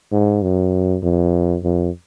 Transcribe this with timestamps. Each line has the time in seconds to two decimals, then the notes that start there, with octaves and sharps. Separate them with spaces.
0.12 G#2
0.42 F#2
1.03 F2
1.64 F2